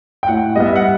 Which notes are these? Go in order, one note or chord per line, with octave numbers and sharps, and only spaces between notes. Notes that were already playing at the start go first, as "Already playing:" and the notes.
G5
A2 F#5
G3 B3 D#5
E5
F#5